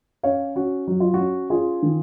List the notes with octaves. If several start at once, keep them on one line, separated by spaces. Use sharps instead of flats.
C#4 C#5 F5
C#4 F#4
F#3 F#4
F4
F#4
C#4
C#4 F4 G#4
D#3